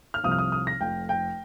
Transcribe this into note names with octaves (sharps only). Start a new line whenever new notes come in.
F6
C2 C3 F3 D#6
F6
D#6
D#6
A#6
F1 F2 F3 G5
G5